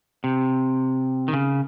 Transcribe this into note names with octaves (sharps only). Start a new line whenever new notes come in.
C3
D#3
C#3